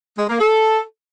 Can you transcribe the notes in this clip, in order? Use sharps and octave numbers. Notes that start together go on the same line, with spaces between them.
G#3
A#3
A4